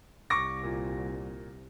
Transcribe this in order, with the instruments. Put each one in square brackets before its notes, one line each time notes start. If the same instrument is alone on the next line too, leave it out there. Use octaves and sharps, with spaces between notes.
[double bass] C2 [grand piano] C#6 D6 A#6
[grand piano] A#2